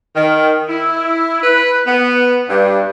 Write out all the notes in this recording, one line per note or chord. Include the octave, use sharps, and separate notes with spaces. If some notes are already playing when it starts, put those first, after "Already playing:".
D#3
E4
B4
B3
G2